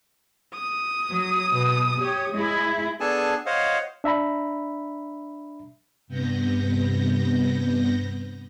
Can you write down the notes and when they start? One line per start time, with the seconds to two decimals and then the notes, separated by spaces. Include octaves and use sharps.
0.54 D#6
1.10 F#3
1.51 B2
2.00 G4 C#5
2.32 G#3 E4
3.00 B3 D4 G#4 A4 G#5 A5
3.46 C5 C#5 D#5 F5 F#5
4.04 D4 E5 A#5 B5
6.08 G2 C3 B3 G6 A#6